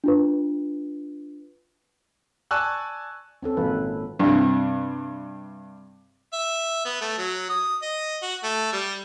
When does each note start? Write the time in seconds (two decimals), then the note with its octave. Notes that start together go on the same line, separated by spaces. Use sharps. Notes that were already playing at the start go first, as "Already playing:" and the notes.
0.04 D4 F4 B4
2.51 D5 G#5 A5 C#6 E6 F#6
3.43 C4 C#4 A4
3.57 G#1 A#2 B4 F5
4.19 G2 C3
6.33 E5
6.85 B3
7.01 A3
7.17 F#3
7.49 D#6
7.82 D#5
8.22 F#4
8.43 A3
8.72 G3